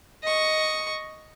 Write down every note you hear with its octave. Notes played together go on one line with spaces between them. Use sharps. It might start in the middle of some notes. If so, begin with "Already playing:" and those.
D#5 C#6